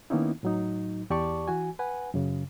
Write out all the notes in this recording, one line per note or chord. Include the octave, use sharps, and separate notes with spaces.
D#3 A#3 B3 C#4 D#4 E4
A2 F#3 D#4
E2 G4 D5 A5 C#6
E3 F#4 G#5
B4 F#5 G#5
F#2 C#3